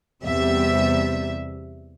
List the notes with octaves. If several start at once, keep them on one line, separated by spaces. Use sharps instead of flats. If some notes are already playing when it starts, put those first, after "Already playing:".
E2 C3 G3 E5